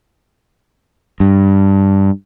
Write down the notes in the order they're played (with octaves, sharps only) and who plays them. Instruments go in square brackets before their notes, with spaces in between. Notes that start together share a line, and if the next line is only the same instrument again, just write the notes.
[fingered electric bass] G2